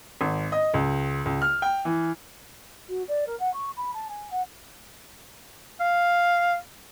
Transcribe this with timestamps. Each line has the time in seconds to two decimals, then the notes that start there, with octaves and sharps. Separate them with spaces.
0.21 G#1
0.52 D#5
0.74 C#2
1.25 C#2
1.42 F6
1.62 G5
1.85 E3
2.89 F#4
3.07 D5
3.26 A#4
3.39 F#5
3.53 C#6
3.76 B5
3.93 A5
4.08 G#5
4.30 F#5
5.80 F5